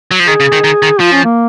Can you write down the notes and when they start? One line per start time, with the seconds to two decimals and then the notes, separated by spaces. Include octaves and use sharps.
0.11 F#3
0.19 F3
0.27 D#3 G#4
0.40 C#3
0.52 D#3
0.64 D#3
0.82 D#3
1.00 F3 F4
1.12 C#4
1.25 A#3